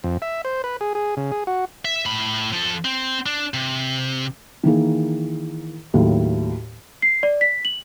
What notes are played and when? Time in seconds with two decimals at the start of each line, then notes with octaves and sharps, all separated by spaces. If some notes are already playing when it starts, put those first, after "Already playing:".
0.04 F2
0.22 E5
0.45 C5
0.64 B4
0.81 G#4
0.95 G#4
1.17 C#3
1.32 G#4
1.47 F#4
1.85 E5
2.06 A2 B5
2.53 F3 A4
2.85 C4
3.26 D4
3.54 C3
4.64 D#3 E3 A#3 G#4
5.94 D#2 A2 F#3 A#3
7.02 C7
7.23 D5
7.41 B6
7.65 F#7